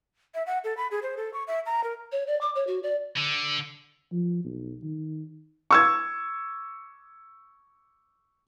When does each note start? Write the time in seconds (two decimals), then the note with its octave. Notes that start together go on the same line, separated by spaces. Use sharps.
0.35 E5
0.47 F#5
0.64 A4
0.77 B5
0.91 G#4
1.03 C5
1.17 A4
1.34 C#6
1.48 E5
1.66 A#5
1.84 A#4
2.12 C#5
2.27 D5
2.41 D6
2.55 C#5
2.67 F#4
2.83 D5
3.17 D3
4.12 F3
4.44 B1
4.83 D#3
5.71 C#6 E6 G#6